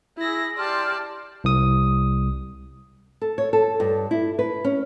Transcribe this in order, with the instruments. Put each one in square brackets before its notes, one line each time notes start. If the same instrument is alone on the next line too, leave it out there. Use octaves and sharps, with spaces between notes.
[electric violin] E4 A#6 [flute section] G#4 E6
[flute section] G4 C6 F6 [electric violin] D5 A5
[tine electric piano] C2 D#6
[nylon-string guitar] A4
C#5
A4
G2
E4
B4
C#4